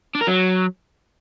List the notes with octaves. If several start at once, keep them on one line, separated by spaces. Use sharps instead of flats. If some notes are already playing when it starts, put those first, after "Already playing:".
D4
A#4
F#3